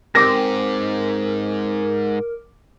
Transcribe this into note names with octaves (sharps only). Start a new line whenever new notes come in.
G#2 C4 A#4 D6 A#6